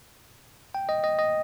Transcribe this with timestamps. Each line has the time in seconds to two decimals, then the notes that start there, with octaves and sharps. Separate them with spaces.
0.75 G5
0.89 D#5
1.04 D#5
1.19 D#5